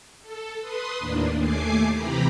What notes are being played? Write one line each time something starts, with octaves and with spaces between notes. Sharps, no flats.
A4
B4 C6 D#6
D#2 A2 A#3 D4
D#2 A3 G#5 D6 C7
C3 E3 G4 A#5 B5